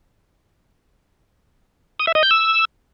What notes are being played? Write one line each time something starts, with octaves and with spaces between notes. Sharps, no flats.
D#6
E5
D#5
G6
E6